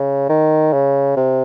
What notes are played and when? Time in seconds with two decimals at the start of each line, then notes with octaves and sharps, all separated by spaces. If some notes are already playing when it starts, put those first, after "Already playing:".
Already playing: C#3
0.30 D#3
0.73 C#3
1.17 C3